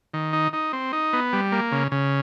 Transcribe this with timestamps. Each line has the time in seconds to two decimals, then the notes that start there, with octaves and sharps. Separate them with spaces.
0.14 D#3
0.33 D#4
0.53 D#4
0.73 C4
0.93 D#4
1.13 B3
1.33 G3
1.52 A#3
1.72 C#3
1.92 C#3